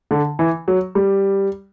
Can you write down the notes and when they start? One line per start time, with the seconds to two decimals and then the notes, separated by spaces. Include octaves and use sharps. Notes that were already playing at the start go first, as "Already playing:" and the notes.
0.11 D3
0.39 E3
0.68 F#3
0.95 G3